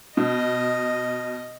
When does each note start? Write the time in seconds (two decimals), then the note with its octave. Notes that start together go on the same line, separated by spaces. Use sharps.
0.17 B2 D#5